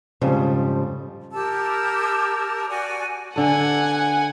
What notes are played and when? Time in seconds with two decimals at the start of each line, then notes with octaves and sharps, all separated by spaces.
0.21 F2 G#2 C#3 F3 G3
1.32 G4 A#4 A5 E6
2.69 F#4 D5 G#5
3.36 D3 A4 F#5 G#5